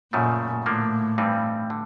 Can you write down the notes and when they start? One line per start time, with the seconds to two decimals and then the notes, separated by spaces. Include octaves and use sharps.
0.13 F#2 A#2 C#3 F3 A3
0.66 A2 D3 F3 A#3 D4
1.18 G2 E3 G3 C4 D#4
1.70 D3